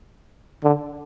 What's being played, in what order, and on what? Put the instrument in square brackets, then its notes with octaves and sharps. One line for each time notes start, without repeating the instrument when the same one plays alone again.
[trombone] D3